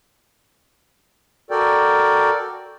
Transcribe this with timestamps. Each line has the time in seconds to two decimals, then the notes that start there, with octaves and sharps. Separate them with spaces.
1.51 F#4 A4 A#4 D5 G5